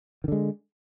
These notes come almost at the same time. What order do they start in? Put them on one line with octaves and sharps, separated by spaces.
D#3 D3 G#3